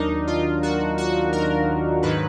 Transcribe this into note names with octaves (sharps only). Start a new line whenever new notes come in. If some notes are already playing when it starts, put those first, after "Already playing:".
Already playing: D#2 D#3 F#3 D4 D#4 A#4
F4
F#4
F#4
A#4
G#2 D#3 F#3 B4